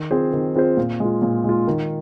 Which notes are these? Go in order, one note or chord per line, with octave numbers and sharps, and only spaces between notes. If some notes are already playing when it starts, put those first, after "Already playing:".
Already playing: D#3
C4 F4 G#4 C5
D#3
C4 F4 G#4 C5
A#2
G#3 F4
A#2
G#3 F4
D#3